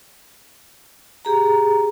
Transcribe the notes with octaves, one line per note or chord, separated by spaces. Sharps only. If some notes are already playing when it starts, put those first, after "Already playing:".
G4 G#4 A#5